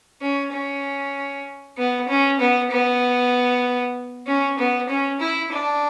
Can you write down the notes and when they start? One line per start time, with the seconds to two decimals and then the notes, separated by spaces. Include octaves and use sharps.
0.21 C#4
0.52 C#4
1.77 B3
2.08 C#4
2.40 B3
2.71 B3
4.27 C#4
4.58 B3
4.89 C#4
5.20 E4
5.52 D4